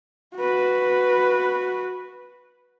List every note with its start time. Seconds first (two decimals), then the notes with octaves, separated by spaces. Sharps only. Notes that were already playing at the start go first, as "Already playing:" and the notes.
0.36 F#4 B4